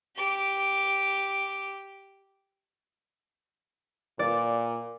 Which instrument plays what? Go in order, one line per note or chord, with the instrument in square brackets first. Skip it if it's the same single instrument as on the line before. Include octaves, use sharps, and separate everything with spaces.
[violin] G4 D6
[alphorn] A#2 [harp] D5